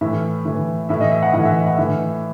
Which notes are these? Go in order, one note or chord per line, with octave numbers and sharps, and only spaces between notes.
A2 E3 E5
A2 E3
A2 E3 E5
D#5
E5
F#5
A2 E3 F#5
E5
F#5
A2 E3 E5